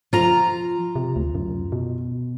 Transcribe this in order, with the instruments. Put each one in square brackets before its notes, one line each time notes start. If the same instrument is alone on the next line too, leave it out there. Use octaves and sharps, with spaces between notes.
[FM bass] F3 [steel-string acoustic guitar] F4 A#5
[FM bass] C3
D2
F#2
B2